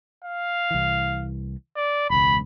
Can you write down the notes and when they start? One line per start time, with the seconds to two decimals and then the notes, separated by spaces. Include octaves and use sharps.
0.25 F5
0.70 C2 E3
1.76 D5
2.10 E1 C#2 B5